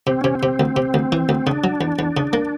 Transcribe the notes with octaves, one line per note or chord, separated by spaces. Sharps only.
C3 C4
C3 C#4
C4
C3
D2
C3
D2
E3
D2
C#3 D4
F#3
E2
E2
C#3
A#3